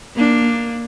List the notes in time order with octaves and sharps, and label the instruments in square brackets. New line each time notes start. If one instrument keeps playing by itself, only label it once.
[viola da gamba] A#3 D4